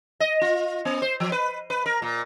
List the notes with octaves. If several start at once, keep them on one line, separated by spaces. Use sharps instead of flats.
D#5
F4
B3
C5
F3
B4
B4
A#4
A#2